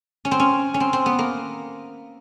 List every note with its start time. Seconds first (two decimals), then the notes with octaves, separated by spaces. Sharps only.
0.25 C#4
0.31 C4
0.40 C#4
0.74 C#4
0.80 C4
0.93 C4
1.06 B3
1.19 A#3